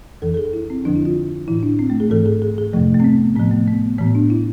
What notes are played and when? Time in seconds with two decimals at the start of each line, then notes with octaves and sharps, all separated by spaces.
0.22 F2 E3 A4
0.34 A4
0.37 G#4
0.53 E4
0.70 C4
0.85 F2 D3 F3 D4
0.96 E4
1.05 F4
1.48 A2 E3 E4
1.63 D4
1.79 C4
1.90 A3
2.00 G#4
2.10 G#2 E3 A4
2.26 G#4
2.42 G#4
2.58 G#4
2.73 F2 C3 F3 A3
2.94 A3
3.00 C4
3.04 B3
3.36 A2 F3 B3
3.51 A3
3.68 B3
3.98 A2 E3 B3
4.15 D4
4.30 E4